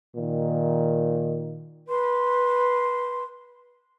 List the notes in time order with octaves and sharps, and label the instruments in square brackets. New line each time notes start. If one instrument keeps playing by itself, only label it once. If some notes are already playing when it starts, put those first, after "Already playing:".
[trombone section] A#2 D#3
[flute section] B4 C6